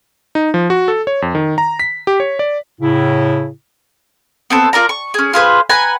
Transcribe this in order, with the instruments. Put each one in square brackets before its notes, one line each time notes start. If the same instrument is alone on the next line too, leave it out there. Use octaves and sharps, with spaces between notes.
[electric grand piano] D#4
F3
F#4
A4
C#5
F2
D#3
A#5
B6
G4
C#5
D5
[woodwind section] A2 C#3 E4
[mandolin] B3 C4 A4
F4 A#4 D5 A#5
C#6
C#4 G#4
F4 G#4 B4 C5
B4 F#5 G#5 A#5